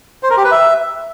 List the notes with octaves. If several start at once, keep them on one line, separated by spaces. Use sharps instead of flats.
C5
A#4
G4
B4
E5